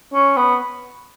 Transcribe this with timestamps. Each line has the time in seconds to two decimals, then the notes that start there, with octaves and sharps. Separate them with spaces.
0.14 C#4
0.37 B3